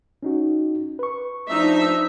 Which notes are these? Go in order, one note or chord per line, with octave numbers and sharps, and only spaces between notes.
C#4 D#4 F#4
B4 C#6
F3 D4 D#4 E5